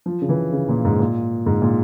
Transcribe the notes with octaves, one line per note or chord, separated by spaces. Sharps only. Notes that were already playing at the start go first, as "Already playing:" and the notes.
F3
C#3
E3
C#3
A#2
G#2
A#2
G#2
A#2